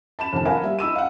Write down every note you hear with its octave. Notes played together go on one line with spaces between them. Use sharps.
A5 B5 E7
F1 D#3 A5
A#4 F5 F#5 G#5 B5
G3 E5
D#4 B5 E6 D#7
F5 F#5